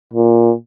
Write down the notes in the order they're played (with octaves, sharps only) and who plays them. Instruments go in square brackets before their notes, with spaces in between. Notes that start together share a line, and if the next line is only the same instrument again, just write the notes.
[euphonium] A#2